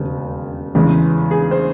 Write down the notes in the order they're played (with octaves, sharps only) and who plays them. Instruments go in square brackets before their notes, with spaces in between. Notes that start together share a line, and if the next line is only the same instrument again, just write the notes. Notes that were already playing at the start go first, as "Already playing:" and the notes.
Already playing: [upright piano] E1 D#2 C#3
E2 C#3 E3 G#3
G#4
C5